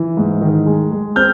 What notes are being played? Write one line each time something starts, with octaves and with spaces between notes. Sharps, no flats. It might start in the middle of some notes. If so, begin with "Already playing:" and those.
Already playing: E3
G#2
D#3
G#3
G#3
C4 F6 G6